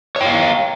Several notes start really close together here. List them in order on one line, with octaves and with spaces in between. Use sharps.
C#5 G5 F5